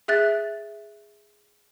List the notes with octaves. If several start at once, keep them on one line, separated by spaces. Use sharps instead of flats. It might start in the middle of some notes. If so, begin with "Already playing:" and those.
G#4 E5 F#6 A6